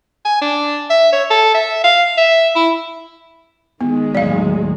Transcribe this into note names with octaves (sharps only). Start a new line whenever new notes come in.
G#5
D4
E5
C#5
A4
E5
F5
E5
E4
D#3 G#3 B3
D#2 A2 F#3 D5 F5